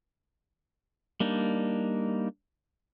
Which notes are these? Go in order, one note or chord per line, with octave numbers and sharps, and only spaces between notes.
G3 A#3 D4 D#4